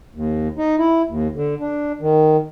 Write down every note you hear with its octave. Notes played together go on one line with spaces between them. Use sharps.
D#2
D#4
E4
D#2
D3
D4
D#3